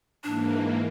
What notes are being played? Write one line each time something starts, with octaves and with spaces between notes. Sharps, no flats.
G#2 E3 A#3 D4